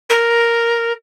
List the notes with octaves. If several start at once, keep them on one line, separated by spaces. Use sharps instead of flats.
A#4